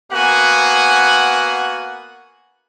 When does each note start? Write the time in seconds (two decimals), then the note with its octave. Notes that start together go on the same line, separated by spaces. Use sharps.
0.12 A#3 B3 F#4 F#5 G#5